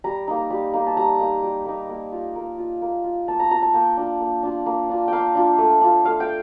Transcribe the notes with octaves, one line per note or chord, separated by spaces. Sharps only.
G3 A#5
A#3 D#4
G3
A#3 D#4
A5
G3 A#5
A#3 D#4
G3
A#3 D#4
A#3
F4
A#3
F4
A#3
F4
A#3 A5
A#5
F4 A#5
A5
A#3 G5
D4 F4
A#3
D4 F4
A#3
D4 F4
A#3 F5 G5
D4 F4
A3
D4 F4
A3 F5
G5